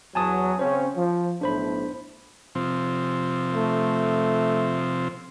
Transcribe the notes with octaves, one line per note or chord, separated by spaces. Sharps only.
E2 F#3 G#5 A5 D#6
C#3 C4 C#4 C5
F3
B1 A2 D4 C5 B5
C3 F3 C4
A3